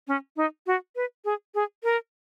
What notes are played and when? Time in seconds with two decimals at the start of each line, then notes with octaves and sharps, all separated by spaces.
0.08 C#4
0.36 D#4
0.66 F#4
0.96 B4
1.25 G#4
1.55 G#4
1.83 A#4